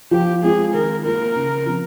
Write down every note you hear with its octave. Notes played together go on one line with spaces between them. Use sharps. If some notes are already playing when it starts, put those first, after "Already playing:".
F3 G4
G#3 C4 F4 G#4
D#3 A#4
A#3 F4 A#4
C#3
F3 C4